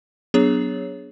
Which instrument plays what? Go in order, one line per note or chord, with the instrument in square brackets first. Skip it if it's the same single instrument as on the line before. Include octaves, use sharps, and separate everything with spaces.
[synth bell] F#3 B3 D4 G#4 C#5